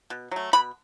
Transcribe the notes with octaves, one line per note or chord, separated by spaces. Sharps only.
B2
F#3 A3
B2 B5